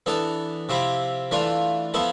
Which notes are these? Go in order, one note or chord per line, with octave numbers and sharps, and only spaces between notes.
E3 B3 D4 A4
C3 F3 C4 E4 G4
E3 A3 D4 F4
F3 B3 E4 A4